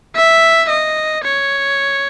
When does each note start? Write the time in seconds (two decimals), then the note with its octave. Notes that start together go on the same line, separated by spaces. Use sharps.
0.17 E5
0.70 D#5
1.25 C#5